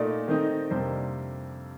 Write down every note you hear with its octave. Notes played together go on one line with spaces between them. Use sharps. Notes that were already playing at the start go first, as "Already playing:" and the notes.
Already playing: A#2 A3 D#4 D5
D#3 A3 C4 D#4
F2 C3 G3 A#3 D4 C5